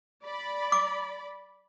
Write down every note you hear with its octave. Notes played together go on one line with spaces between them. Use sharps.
D5 B5
D6